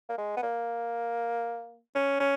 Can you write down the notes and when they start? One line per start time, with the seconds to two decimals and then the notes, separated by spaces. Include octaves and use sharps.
0.09 A#3
0.18 G#3
0.37 B3
0.42 A#3
1.95 C#4
2.20 C#4